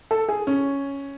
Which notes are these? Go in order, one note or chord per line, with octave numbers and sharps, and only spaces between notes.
A4
G#4
C#4